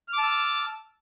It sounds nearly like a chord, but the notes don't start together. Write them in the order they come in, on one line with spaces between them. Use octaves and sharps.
F6 D6 A5 E6